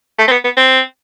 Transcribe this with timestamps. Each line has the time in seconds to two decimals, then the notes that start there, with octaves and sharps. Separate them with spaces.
0.19 A3
0.28 C4
0.31 B3
0.44 B3
0.57 C4